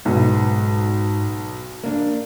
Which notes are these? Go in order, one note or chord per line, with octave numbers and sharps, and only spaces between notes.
B1 G#2 B3
A#3 D4